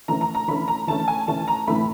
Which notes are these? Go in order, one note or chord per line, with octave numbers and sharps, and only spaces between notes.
E3 A3 C#4 A#5
A#5
A#5
E3 A3 C#4 B5
A#5
E3 A3 C#4 A5
G#5
E3 A3 C#4 A5
A#5
A2 E3 A3 B5